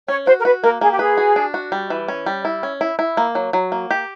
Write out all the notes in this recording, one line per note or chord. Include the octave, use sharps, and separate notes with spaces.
C#4 C#5
F#4 C5
A#4
F#4 B4
A#3 A#4
A#3 G#4
G4
G#4 B4
F#4
D4
F#4
G3
E3
C#4
G3
E4
C#4
E4
E4
A#3
F#3
F#3
A#3
G4